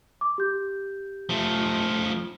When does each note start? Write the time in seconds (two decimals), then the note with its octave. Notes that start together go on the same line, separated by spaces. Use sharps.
0.21 D6
0.38 G4 G6
1.29 F3 A3